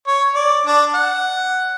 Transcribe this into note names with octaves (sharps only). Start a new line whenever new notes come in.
C#5
D5
D4
F#5